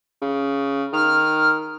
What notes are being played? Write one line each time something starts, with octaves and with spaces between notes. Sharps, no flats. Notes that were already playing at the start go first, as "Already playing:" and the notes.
C#3
D#3 F6